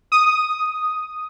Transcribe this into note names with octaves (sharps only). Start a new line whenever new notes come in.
D#6